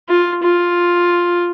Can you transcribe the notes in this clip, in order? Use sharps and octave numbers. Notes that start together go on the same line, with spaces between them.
F4
F4